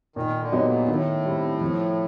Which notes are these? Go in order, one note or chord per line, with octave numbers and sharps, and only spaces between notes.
A#2 D#3
D3
F#3 B3 D#4 G4
A#2
A2 D#3
G3 C4
F3